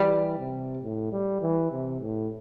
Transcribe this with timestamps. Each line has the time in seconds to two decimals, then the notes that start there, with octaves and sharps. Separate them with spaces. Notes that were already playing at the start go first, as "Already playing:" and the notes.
Already playing: E3 G3
0.39 C3
0.83 A2
1.12 G3
1.42 E3
1.72 C3
2.01 A2